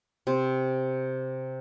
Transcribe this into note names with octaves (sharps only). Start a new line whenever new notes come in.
C3